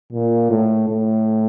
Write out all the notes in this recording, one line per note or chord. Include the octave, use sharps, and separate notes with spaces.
A#2
A2
A2